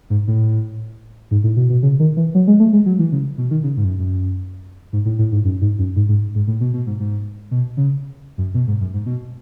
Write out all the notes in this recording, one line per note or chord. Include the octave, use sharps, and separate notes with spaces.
G#2
A2
G#2
A2
B2
B2
C#3
D#3
E3
F#3
G#3
A3
G#3
F#3
E3
C#3
B2
D#3
C#3
G#2
F#2
F#2
G#2
A2
A2
G#2
F#2
G#2
F#2
G#2
G#2
G#2
A2
B2
B2
G#2
G#2
B2
C#3
F#2
B2
G#2
F#2
G#2
B2